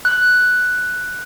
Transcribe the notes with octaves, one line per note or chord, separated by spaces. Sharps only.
F#6